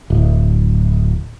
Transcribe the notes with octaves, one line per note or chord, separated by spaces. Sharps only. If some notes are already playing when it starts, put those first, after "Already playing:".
D1